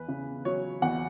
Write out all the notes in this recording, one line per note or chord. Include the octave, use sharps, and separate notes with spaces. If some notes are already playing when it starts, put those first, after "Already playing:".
Already playing: E2 B4
C#3
F#3 C#5
E2 F#5